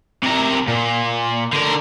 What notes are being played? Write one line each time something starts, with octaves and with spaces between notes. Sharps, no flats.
C3 A#4
A#2
D3 A#4